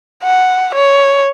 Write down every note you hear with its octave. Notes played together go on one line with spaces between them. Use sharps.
F#5
C#5